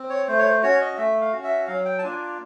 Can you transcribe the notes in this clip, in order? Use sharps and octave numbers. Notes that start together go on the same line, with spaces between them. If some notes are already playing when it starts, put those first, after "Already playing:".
Already playing: C4
C#5
A3 C5
C#5
C5
C#4 F#4 C#5
D#5
A3 E5
F5
C#4 F#4
E5
F#3 F5
G5
A5
A#3 D4 F4 G#5